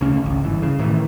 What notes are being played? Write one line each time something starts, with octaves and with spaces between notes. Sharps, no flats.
D2 C#3 C#4
G#1 C#2
G1 E3
C#3
A2 D#3 E3